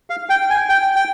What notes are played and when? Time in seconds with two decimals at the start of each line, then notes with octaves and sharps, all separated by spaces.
0.10 F5
0.29 G5
0.50 G#5
0.69 G5
0.96 G5